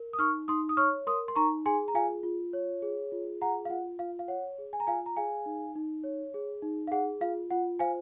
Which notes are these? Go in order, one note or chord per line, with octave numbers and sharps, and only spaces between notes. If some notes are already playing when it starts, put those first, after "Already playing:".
Already playing: A#4
D#6
D#4 C#6 F6
D#4 C6 D#6
D#6
C#5 C#6 F6
A#4 C6 D#6
C6
D#4 A#5 C#6
G#4 G#5 C6
A#5
F4 F5 G#5
F4
C#5
G#4
F4
G#4 F#5 A#5
F5
F4 F#5
F4 F5
F5
C#5 F#5
G#4
G#5
A#5
F4 F5 G#5
A#5
G#4 F5 G#5
D#4
D#4
C#5
G#4
D#4
F5
G#4 F#5
F4 F5
F4 F#5
C5 F5 G#5